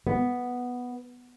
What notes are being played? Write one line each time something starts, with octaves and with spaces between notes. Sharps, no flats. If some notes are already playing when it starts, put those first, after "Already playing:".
B3